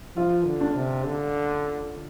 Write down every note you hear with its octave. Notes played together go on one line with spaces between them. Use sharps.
F3 F4
D3
D4
C3
D3